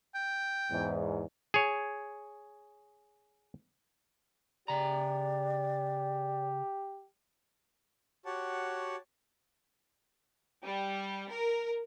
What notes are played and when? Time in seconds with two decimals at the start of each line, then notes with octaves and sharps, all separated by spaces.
0.15 G5
0.70 E2 G#2
1.54 G#4 C#5
4.68 C#3 G4 D5 A#5
8.26 F#4 G4 C#5 F#5 A5
10.65 G3
11.31 A#4